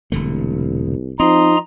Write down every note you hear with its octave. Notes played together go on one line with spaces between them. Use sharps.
E1 C2 D3 A3
F3 C4 D#4 D#5 A#5 C6